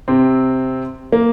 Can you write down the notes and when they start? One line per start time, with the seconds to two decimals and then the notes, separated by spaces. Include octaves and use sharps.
0.08 C3 C4
1.12 A#3